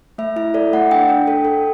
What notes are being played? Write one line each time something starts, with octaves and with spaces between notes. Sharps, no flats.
A3 E5
E4 E5
A4 D5
A3 F#5
D4 G5
D4
A4
A4